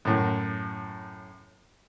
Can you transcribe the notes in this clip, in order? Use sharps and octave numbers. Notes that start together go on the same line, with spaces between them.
F#2 A2